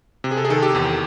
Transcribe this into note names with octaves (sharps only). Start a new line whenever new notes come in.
C3
G#4
A4
G#4
D#3 A4
G4
E2